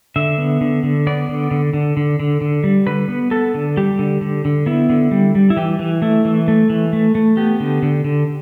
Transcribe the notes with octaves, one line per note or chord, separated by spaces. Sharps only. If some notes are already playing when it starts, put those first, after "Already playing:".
D3 E5
B3
D3
D3
B3 D5
D3
D3
D3
D3
D3
D3
G3
D3 B4
B3
B3 A4
D3
G3 G4
D3
D3
D3
B3 E4
D3
G3
G3
E4
E3 G4
E3
A3 E4
E3
A3
E3
A3
A3
B3 G4
D3
D3
D3